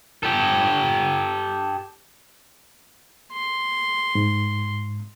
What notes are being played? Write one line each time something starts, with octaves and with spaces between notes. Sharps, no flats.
G4 A4
C6
G#2